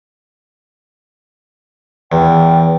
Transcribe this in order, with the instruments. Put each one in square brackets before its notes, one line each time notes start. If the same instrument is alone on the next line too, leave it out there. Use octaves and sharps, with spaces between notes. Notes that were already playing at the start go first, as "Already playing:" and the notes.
[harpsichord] E2 [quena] G5